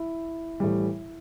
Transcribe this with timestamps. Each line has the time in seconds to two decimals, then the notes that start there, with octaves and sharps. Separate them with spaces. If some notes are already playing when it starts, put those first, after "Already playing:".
Already playing: E4
0.60 A2 E3 G3